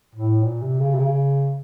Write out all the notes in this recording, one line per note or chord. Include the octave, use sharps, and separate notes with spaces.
A2
A#2
C3
C#3
C3
C#3